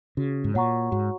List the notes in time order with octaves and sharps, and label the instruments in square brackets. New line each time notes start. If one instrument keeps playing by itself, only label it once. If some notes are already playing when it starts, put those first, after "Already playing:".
[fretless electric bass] C#3 [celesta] F#4
[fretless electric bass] G#2
[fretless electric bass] A#2 [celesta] C#5 F#5 A#5 C#6
[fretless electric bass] G#2 [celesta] F#4